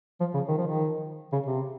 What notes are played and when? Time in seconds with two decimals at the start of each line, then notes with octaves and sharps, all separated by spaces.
0.20 F3
0.34 C#3
0.48 D#3
0.58 F3
0.67 D#3
1.32 C#3
1.46 C3